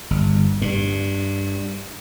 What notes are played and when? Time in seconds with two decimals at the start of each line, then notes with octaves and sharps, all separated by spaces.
0.11 G1
0.62 G2